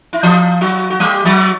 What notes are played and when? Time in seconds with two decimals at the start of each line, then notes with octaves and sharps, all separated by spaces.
0.13 E4
0.23 F3 F4
0.61 F#3 F#4
0.90 F#4
1.00 G3 G4
1.25 F#3 F#4